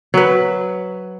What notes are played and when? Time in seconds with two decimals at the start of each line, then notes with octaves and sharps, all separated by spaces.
0.14 F#3 B4